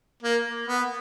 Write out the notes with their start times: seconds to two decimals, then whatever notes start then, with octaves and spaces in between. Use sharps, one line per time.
0.23 A#3
0.68 B3